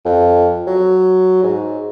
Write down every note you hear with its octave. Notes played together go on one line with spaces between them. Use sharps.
F2
F#3
G#2